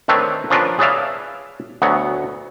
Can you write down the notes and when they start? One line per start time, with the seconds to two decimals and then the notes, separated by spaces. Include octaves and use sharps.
0.08 D#3 A3 C4 D4 B4 C#5
0.50 F3 C#4 D4 F4 A#4 B4
0.79 G#4 B4 C#5 D5 E5 F5
1.82 D2 F#3 B3 F#5